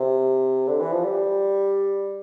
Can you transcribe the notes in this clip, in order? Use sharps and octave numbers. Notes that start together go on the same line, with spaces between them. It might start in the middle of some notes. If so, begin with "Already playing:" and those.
Already playing: C3
D3
E3
F3
G3